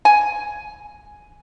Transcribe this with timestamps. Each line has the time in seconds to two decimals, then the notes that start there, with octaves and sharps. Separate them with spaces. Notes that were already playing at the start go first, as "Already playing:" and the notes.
0.05 G#5